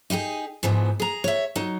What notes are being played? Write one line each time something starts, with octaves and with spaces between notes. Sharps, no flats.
D#4 E4 G4 G#4
G#2 E3 F3 B3
G#4 A#5
C#5 E5
F#3 D#4